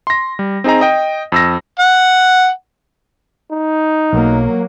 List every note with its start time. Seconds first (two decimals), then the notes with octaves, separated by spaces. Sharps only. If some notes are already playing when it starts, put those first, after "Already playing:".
0.07 C6 A#6
0.39 G3
0.64 C4 D#4 G#4 D#5 A#5
0.81 D#5 G5
1.32 F2 E6 A#6
1.79 F#5
3.52 D#4
4.13 B1 F#3 A#3